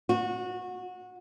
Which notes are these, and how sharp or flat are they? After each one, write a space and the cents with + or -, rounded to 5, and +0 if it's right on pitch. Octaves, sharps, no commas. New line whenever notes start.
F#4 -20